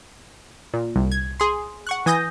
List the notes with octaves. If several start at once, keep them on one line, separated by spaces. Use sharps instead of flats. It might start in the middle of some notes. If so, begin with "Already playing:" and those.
A#2
C2
G#6
G#4 C6
F#5 C#6 F#6
E3 G#5 D#6 G6 A#6